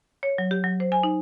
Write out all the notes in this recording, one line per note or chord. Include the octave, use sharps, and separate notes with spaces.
C#5
F#3
G4
F#3
C5
G#5
D#4